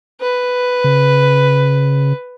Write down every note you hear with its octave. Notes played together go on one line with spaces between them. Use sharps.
B4
C#3